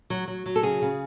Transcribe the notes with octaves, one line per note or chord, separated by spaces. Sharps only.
F#3
F#3
F#3
A4
C#3 G#4
C#3